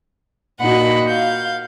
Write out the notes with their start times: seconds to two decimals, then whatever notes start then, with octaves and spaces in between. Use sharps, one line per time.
0.61 A#2 D#4 F#4 F#5 B5
1.09 F5 G6